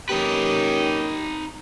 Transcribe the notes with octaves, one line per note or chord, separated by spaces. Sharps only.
A#3 C#4 D#4 G4 B4